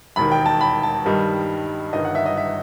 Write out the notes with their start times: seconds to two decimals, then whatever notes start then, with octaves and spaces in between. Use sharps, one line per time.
0.16 E1 D#2 D#3 B5
0.31 G5
0.46 A5
0.61 B5
0.83 A5
1.05 G2 D#3 G3 D#4
1.93 G1 G2 D#3 D#5
2.05 F#5
2.15 E5
2.26 D#5
2.37 E5